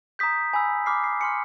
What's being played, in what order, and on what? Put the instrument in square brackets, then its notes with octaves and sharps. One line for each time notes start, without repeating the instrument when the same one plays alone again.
[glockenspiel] A#5 D#6 G6 B6
G#5 B5 E6
B5 D6 F6 C7
C7
G#5 C6 F6 C#7